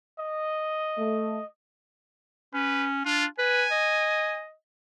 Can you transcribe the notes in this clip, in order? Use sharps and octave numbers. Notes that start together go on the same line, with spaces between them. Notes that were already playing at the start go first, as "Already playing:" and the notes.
D#5
A3
C#4 B4
D4 F4
B4 G#5
D#5